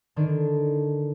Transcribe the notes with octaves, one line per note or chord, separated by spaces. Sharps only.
D3 D#3 D4